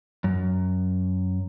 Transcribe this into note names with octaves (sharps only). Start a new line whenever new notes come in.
F#2